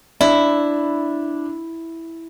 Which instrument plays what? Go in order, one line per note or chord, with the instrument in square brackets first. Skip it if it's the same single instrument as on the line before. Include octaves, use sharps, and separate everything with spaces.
[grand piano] D4 [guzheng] E4